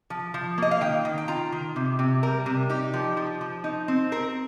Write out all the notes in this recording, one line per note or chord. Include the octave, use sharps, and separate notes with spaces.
F3
F3
A#3 D#5
F5
D#3 G5
D#3
G5
F4 A#5
D#3
C3
C3
G3 A#4
C3
D#4 G4
F3
F3
F3
D#4
C4
C4 A#4